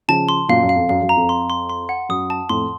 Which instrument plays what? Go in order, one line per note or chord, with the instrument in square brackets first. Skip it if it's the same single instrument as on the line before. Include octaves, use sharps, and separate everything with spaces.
[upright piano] C#3 F3 [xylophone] A5
[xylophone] C6
[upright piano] F#2 A#2 [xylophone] F5
[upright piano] F#2
[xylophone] F5
[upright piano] F2
[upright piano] F#2 [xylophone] F5
[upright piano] F#2
[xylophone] A#5
[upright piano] F2
[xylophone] C6
C6
C6
F#5
[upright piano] F#2 [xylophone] D#6
[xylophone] A5
[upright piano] F2 A2 [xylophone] C6